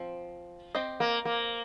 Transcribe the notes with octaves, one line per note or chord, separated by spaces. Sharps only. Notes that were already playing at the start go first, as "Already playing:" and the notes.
Already playing: F3 C4
C4 G4 C5 D#5
A#3
A#3